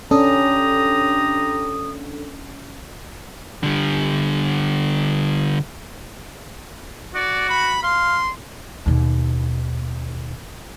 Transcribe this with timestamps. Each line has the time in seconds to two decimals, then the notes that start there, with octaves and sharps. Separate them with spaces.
0.11 C#4 D4 G4 A4 A#5 D#6
3.63 D3 G3
7.15 F#4 D5
7.49 B5
7.83 F5 C6
8.86 D#2 B2